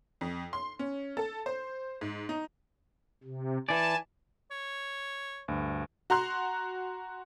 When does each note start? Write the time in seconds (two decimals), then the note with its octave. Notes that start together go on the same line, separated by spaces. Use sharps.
0.21 F2
0.53 C6
0.79 C#4
1.17 A4
1.46 C5
2.01 G#2
2.29 D#4
3.24 C3
3.69 E3 D5 G#5 A5
4.51 C#5
5.48 D2 G2
6.10 F#4 A#5 C6 F#6